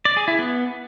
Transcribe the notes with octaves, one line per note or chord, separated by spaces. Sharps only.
D5
G#4
E4
B3